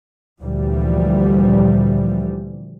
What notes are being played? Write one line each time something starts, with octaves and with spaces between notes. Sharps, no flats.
D2 A#2 E3 F3 G3